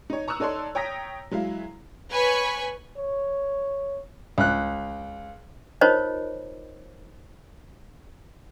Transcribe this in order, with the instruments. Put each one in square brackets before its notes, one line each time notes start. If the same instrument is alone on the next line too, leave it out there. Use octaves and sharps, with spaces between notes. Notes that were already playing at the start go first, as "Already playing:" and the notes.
[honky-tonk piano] D#4 C#5
A#5 C#6 D#6 E6 F#6
D#4 A4 C#5 D5 C6
C#5 G5 A#5 D#6 A#6 B6
F#3 G#3 E4 F5
[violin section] B4 C#5 G#5 B5 C#6
[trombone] C#5
[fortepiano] C#2 F#6
[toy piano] D#4 F4 A#4 C5 C#5 D#5